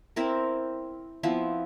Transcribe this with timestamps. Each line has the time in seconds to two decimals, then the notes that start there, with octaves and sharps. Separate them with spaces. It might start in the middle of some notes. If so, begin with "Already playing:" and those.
0.16 C4 E4 A#4
1.23 F3 B3 C4 E4